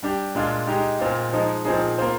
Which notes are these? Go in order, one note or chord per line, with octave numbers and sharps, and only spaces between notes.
G3 D4 G4
A#2 G#3 D4 F4
G#3 D#4 G4
A#2 G#3 C4 F4
F3 G#3 D#4
A#2 F3 C4 D#4 G#4
A#3 F4 C5